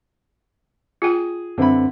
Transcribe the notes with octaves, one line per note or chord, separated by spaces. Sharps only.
F4 G#4 G5
F#2 D3 C4 B4 E5 B5